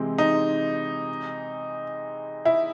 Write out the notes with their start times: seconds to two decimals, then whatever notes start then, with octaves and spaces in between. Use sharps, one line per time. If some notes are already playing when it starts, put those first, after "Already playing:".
Already playing: C3 E3 G#3 C4
0.18 D#4
2.46 E4